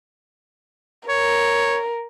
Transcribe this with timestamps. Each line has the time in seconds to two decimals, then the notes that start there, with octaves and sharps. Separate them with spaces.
1.09 A#4 C#5